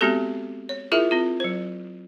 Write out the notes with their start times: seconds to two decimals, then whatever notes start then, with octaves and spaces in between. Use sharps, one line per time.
0.01 G#3 B3 C4 F#4 G4 A4
0.69 C#5
0.92 E4 F4 G#4 A#4 E5
1.11 C4 F4
1.40 F#3 C5